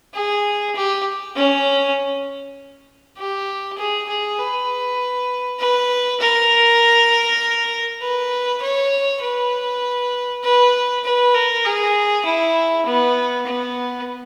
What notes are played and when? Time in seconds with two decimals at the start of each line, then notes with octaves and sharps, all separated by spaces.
0.15 G#4
0.75 G4
1.36 C#4
3.17 G4
3.78 G#4
4.08 G#4
4.38 B4
5.60 B4
6.20 A#4
8.02 B4
8.62 C#5
9.23 B4
10.44 B4
11.04 B4
11.34 A#4
11.65 G#4
12.26 E4
12.86 B3
13.47 B3